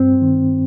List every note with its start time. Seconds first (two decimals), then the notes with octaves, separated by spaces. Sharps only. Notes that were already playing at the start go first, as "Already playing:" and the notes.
Already playing: G2 C4
0.22 D#3